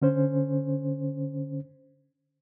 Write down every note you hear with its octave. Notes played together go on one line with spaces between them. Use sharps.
D3 C#4 C5